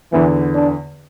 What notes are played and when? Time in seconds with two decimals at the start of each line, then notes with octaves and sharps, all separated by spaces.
0.12 E2 D3 E3 B3
0.55 D4